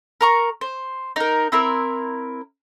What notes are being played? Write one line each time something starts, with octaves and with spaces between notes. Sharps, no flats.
A#4 A#5 C#6
C5
D#4 A#4
C4 E4 A#4